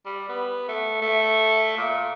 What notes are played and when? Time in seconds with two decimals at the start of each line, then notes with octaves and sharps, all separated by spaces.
0.05 G3
0.29 B3
0.68 A3
1.01 A3
1.77 A#2